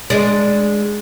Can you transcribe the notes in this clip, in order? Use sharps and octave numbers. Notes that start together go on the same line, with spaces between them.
G#3 D4